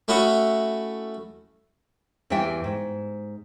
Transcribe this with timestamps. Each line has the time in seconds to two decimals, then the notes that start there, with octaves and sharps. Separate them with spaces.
0.08 A3 C#4 E4 F#4 D#5
2.30 E2 E3 G3 E5 G5 G#5
2.64 G#2